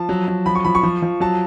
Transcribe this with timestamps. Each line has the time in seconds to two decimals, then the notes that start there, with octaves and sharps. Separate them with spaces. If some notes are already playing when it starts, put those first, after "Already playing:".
Already playing: F3 A5
0.09 F#3
0.28 F#3
0.46 F3 B5
0.55 C#6
0.65 F3 B5
0.75 C#6
0.83 F3
1.02 F3
1.20 F#3 A5